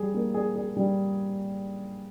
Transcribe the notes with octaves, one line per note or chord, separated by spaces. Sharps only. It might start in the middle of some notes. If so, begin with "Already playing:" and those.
Already playing: G3 G#4
A#3
G#4
G#4
G3